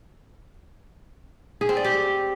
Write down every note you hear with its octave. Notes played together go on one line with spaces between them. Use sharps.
G#4
C4
D5
G4